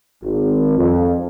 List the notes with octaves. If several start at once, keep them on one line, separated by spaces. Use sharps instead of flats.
G#1
F2